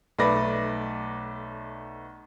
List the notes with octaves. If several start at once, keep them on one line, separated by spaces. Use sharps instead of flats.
B1 A3 B4 D5 A#6